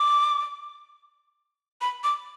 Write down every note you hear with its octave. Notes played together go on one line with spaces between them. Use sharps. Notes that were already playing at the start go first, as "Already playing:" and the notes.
Already playing: D6
B5
D6